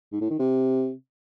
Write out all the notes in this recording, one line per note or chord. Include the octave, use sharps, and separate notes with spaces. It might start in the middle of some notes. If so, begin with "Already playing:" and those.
G#2
A2
D#3
C3